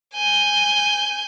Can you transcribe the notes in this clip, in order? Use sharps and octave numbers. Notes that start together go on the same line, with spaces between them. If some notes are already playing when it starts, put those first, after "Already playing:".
G#5 G6